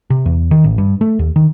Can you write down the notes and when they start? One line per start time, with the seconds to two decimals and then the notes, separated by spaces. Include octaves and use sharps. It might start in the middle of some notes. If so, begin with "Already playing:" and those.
0.10 C3
0.26 E2
0.51 D#3
0.64 A1
0.78 G2
1.01 A3
1.19 D#2
1.36 D#3